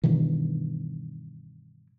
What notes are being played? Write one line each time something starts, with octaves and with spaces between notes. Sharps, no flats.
G2 B2 D#3 E3